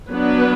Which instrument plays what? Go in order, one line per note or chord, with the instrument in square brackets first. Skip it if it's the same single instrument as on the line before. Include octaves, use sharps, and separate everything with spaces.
[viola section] F#3 B3 D4 B4